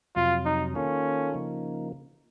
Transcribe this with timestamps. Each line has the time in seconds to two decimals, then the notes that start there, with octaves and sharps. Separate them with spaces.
0.15 F2 C3 F#3 F4
0.45 D#4
0.75 D#3 A#3 C#4 F4 A4
1.33 C#3 F3 A#3 D#4